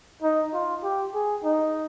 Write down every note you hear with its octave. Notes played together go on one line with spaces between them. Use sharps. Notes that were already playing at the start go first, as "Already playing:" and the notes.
D#4
F4
G4
G#4
D#4